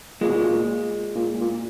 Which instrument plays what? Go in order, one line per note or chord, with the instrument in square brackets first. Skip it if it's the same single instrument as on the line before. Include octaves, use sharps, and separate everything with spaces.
[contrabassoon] A#2 [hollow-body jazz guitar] G#3
[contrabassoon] B2
A#2
A#2
A#2